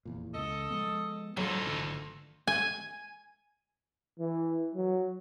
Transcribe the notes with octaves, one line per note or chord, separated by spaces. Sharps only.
F1 E2 A#2
C#2 A4 D#5
F3 G#3 B3
D2 E3 F#3 D#4 F4 A4
G#1 D3 D4
G#5
E3
F#3